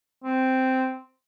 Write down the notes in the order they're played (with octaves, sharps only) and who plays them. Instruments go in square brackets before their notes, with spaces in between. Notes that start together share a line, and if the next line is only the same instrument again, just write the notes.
[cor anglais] C4